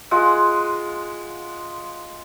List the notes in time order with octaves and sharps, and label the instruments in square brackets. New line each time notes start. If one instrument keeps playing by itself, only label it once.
[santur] G#3 F4 F#5